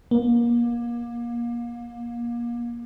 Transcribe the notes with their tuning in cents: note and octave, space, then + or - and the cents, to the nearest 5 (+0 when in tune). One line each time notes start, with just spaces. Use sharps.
A#3 +30